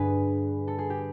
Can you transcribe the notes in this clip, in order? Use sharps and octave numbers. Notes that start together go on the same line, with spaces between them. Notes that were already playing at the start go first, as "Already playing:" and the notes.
Already playing: G2 D3 G#4 B4
A4
G#4
G4